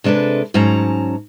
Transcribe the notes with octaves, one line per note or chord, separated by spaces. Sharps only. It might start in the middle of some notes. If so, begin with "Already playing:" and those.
C3 G#3 D4 A4 B4
G#2 F#3 C#4 A5 A#5